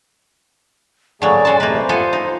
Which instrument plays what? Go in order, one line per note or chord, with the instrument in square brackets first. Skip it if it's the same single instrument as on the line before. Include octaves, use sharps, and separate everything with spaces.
[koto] A2 F#3 [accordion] D3 A#3 G#4 [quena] D5
[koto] A#2 F#4 A5 [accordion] C#4 C6
[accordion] E2 C3 A3 [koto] A#3 B4 [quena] D#5
[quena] C5
[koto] B3 A4 G#5 [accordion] F4 C6
[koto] D#4